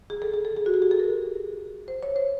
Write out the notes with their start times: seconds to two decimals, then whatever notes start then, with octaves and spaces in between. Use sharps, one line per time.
0.10 G#4
0.22 A4
0.34 G#4
0.45 A4
0.56 G#4
0.66 F#4
0.74 G4
0.82 G#4
0.91 A4
1.00 A#4
1.88 C5
2.03 C#5
2.16 C5